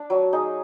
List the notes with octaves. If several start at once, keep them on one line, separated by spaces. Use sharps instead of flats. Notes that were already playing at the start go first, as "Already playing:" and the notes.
Already playing: D4
F#3
D#4 G#4